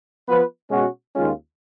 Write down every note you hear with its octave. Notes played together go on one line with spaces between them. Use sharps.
F3 B3 F4 B4
B2 G#3 C#4 F#4
D#2 D#3 G#3 C#4 F4